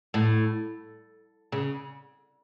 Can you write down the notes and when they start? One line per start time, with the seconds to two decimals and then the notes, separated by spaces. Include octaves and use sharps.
0.14 A2
1.52 C#3